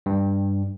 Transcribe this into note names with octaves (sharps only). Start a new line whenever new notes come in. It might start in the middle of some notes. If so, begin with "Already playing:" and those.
G2